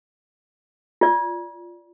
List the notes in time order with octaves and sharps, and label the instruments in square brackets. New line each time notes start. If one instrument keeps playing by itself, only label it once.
[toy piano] F4 D5